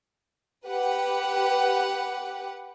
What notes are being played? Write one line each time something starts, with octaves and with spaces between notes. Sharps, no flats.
G4 B4 F#5